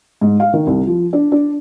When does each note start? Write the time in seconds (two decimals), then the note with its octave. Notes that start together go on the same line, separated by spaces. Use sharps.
0.21 G#2
0.40 F5
0.53 D#3
0.67 C2
0.87 F3
1.13 D4
1.32 D4